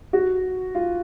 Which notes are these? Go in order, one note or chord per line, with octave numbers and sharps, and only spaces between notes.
F#4
F4